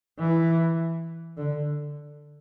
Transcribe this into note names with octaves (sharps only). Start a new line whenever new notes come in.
E3
D3